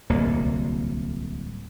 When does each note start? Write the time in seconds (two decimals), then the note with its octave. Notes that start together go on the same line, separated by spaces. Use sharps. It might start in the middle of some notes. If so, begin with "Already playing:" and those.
0.10 D1 C2 A#3